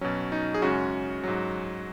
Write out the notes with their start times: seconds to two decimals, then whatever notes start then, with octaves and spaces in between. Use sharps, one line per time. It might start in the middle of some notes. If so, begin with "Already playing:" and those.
0.01 B2 F#3 C#4
0.32 D#4
0.54 G#4
0.62 F#2 C#3 G#3 C#4 F#4
1.24 G#2 F#3